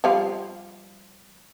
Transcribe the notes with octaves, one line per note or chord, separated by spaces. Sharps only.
F3 G3 F4